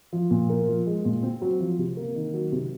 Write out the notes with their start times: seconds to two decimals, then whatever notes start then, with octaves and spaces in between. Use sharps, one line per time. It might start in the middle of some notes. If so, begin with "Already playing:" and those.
0.13 F3
0.31 A#2
0.50 A#3
0.68 F3
0.87 G#3
1.05 A#2
1.23 C4
1.41 F#3
1.60 F3
1.78 C3
1.97 A#3
2.15 D#3
2.34 F#3
2.52 C3